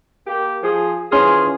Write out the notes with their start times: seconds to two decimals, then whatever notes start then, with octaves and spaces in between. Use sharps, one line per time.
0.27 A#3 G4
0.63 F3 G#4
1.12 E3 F3 C#4 G#4 C6 F6